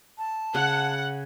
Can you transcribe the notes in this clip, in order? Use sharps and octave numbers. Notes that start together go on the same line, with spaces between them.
A5
C#3 F#5